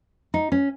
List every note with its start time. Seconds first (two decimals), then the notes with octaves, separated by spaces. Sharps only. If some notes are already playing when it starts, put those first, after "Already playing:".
0.34 D#4
0.52 C#4